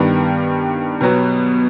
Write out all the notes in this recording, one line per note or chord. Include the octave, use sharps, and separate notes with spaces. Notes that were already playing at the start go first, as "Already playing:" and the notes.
Already playing: G2 D#3 G3 B3
B2 F#3 B3